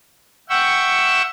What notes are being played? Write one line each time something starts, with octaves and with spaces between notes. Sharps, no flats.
E5 F#5 G5 C#6 E6